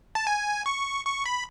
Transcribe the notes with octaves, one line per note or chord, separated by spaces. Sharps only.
A5
G#5
C#6
C#6
B5